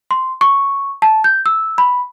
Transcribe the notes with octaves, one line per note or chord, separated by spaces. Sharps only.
C6
C#6
A5
G6
E6
B5